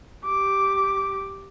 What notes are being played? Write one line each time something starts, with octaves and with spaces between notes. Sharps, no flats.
G4 D6